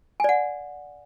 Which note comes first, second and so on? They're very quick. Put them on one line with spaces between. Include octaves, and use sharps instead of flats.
G#5 D5 F#5